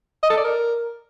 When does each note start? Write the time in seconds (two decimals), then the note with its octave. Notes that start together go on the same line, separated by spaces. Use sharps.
0.23 D#5
0.30 A4
0.37 D5
0.44 A#4